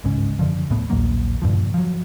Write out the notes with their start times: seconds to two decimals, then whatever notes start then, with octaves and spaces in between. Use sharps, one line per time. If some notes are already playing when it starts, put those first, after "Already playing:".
0.04 G1 C#2 G#2 C#4
0.39 F#2 D3 F3
0.70 D2 A2 A3 B3
0.90 A#1 D#2 F#3 A#3
1.42 F#1 G2 A#2 F3
1.74 F3 F#3